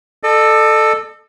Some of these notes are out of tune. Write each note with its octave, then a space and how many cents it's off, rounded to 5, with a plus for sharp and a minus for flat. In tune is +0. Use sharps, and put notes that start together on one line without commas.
A4 +0 D#5 -45